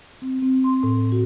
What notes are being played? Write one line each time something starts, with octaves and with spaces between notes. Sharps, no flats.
C4
C4
C6
A2
F#4